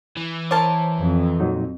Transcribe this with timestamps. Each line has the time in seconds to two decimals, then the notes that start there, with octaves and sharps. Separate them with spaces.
0.17 E3
0.51 E4 A#4 C5 C#5 A5 D6
1.00 F2
1.40 A#2 F#3 D#4